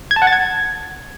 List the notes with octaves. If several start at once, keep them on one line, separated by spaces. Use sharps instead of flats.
G#6
A5
F#5
A6
G#6